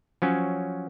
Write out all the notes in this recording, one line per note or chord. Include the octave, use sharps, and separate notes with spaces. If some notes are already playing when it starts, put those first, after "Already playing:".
F3 F#3 C#4